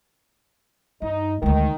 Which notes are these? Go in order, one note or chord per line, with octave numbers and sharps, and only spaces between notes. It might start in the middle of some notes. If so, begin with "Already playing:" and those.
G2 D#4
D2 D#3 G#3